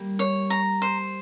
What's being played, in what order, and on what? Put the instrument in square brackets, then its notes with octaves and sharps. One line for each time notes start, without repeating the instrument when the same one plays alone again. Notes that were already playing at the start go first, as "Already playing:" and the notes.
Already playing: [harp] G3 A#3
[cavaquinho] C#5
A#5
C5